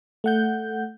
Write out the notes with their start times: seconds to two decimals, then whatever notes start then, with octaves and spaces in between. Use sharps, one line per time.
0.24 A3 F#5 G6